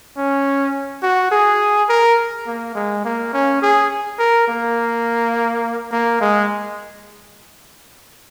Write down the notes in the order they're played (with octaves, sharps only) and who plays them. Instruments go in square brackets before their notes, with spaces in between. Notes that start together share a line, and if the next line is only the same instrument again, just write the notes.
[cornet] C#4
F#4
G#4
A#4
A#3
G#3
A#3
C#4
G#4
A#4
A#3
A#3
G#3